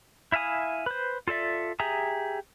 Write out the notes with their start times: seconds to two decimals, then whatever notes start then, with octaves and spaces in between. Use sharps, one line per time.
0.32 E4 E5 F5 G#5 D#6
0.86 B4 C5
1.28 F4 A4 D5 E5
1.80 G4 G#4 E5 A#5 D#6